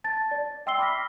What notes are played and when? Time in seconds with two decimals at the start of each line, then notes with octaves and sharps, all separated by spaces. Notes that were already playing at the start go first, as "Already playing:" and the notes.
0.04 A5 A6
0.31 D5
0.66 E5 G5 C6 E6 C7 G7
0.79 B5 D6 E6 F6 A#6 B6